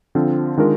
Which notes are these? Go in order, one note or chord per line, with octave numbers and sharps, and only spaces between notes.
D3 F3 C4 F4
D#3 G#3 D4 F4 A#4